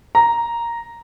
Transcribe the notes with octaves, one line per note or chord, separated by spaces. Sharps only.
A#5